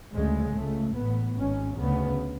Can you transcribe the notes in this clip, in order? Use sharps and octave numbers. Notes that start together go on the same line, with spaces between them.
D2 C#3 G#3
C#2 C#3 A3
A1 A2 B3
G#1 G#2 C#4
D2 C#3 B3